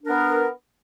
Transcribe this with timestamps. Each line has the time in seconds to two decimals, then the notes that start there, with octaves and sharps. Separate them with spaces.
0.02 D4
0.05 A#4
0.08 B3